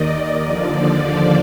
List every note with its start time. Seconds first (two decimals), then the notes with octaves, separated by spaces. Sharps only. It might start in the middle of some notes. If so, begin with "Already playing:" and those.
Already playing: D#2 D#3 D5 D#5
0.43 D#2 D3 F3